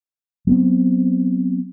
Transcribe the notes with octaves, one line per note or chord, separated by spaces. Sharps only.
F#3 B3 C4